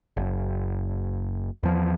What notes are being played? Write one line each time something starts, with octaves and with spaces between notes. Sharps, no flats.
F#1
E2 F3